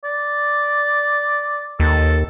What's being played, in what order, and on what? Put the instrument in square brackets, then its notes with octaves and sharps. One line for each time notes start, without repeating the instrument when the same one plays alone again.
[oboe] D5
[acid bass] D#2 [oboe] A4